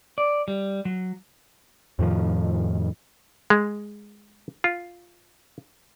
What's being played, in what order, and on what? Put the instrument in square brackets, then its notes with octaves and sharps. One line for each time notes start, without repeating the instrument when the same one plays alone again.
[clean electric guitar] D5
G3
F#3
[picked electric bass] F2 A2 D#3 F3
[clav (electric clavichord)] G#3
F4